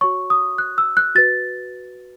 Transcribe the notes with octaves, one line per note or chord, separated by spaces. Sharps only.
F#4 C#5 C#6
D#6
F#6
E6
F#6
F#4 B4 A6